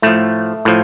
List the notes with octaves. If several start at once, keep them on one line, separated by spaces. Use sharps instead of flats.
A2 F3 A3
A2 F3